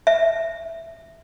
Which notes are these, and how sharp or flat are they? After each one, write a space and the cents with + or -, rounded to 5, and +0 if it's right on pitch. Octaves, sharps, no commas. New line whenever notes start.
E5 +5